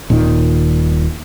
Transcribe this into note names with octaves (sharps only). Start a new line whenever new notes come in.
D#1 A#2 D#3